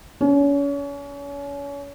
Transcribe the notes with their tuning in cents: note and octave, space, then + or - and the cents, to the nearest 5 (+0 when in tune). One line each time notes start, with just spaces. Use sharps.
C#4 +35